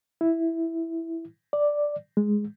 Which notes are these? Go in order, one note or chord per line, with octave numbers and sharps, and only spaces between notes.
E4
D5
G#3